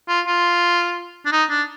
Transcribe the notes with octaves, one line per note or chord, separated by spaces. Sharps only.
F4
F4
D4
D#4
D4